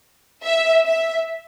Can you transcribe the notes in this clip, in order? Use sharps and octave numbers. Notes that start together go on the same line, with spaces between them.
E5
E5